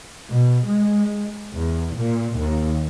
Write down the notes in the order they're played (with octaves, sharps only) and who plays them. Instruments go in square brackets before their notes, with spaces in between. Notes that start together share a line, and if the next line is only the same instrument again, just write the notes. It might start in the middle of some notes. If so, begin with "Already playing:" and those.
[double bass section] B2
G#3
E2
A#2
D#2